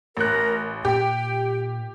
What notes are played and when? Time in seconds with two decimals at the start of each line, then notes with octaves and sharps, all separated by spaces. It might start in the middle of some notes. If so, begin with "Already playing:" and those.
0.17 A1 A#4 F#6
0.85 A#2 G4 G5